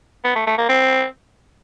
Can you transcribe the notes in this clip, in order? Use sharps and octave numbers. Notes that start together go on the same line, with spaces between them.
B3
A3
A3
A#3
C4